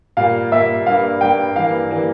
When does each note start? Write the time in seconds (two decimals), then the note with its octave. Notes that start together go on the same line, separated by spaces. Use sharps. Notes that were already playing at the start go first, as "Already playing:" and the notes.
0.17 A#2 G3 A#3 F5
0.52 A#2 G3 A#3 E5
0.86 G2 G3 A#3 F5
1.21 G2 G3 A#3 G5
1.56 G2 E3 G3 A#3 F5
1.91 E3 G3 A#3